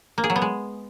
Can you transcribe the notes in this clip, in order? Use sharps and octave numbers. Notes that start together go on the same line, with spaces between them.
A#3
G#4
F#3
B3
G#3